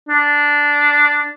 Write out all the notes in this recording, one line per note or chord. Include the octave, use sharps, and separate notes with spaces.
D4